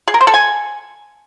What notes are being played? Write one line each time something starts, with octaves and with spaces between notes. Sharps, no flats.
G#4
A#4
C5
A4
G#5